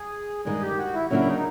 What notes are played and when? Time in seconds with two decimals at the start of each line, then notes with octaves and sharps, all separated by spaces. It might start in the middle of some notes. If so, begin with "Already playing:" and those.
Already playing: G#4
0.45 G2 D#3 G#3 G#4
0.61 G4
0.78 F#4
0.94 E4
1.10 C#3 F#3 A#3 D4 E4 F#4
1.27 D#4